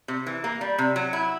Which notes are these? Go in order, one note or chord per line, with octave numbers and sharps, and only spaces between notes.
C3
E3
A#3
G3
C3
F#3
E4